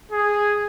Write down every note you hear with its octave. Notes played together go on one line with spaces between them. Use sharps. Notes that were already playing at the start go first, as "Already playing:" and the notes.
G#4